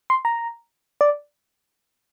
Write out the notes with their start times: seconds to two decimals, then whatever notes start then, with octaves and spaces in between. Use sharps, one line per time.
0.10 C6
0.25 A#5
1.01 D5